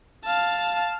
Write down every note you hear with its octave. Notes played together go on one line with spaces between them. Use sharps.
F5 A5